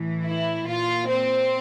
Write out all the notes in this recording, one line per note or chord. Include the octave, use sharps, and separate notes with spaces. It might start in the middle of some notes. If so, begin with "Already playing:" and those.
Already playing: A2 E3
E4
A#2 F4
C4